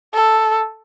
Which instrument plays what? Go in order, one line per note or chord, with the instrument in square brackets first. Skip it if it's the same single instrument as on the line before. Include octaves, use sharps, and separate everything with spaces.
[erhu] A4